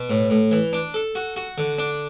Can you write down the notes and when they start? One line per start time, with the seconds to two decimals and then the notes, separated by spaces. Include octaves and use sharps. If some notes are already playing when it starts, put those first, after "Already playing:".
Already playing: B2
0.10 A2
0.30 A2
0.51 E3
0.73 D4
0.94 A4
1.15 F#4
1.36 F#4
1.58 D3
1.78 D4